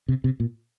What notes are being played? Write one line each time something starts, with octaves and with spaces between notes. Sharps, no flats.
C3
C3
A#2